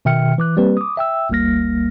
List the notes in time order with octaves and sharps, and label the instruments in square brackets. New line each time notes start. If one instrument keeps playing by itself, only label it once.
[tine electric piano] B2 D#3 E5 G5 F6 C#7
E3 D6 F#6
G3 A#3 C4 G4 B4
D6 D#6
E5 G5 E6
G1 D2 G3 A#3 F6 A#6